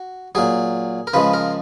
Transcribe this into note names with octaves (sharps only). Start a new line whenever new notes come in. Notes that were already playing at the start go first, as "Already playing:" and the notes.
Already playing: F#4
A#2 F#3 G#4
A#4
C#3 F3 G#3 B4
A#4